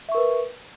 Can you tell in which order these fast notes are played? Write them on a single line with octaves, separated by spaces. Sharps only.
E5 C#6 A#4 B4